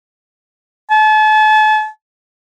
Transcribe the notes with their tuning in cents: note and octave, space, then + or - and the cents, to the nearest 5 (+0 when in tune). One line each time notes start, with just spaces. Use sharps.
A5 -40